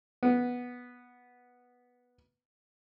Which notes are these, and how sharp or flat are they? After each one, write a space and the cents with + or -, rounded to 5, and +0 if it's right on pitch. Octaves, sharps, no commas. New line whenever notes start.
B3 -5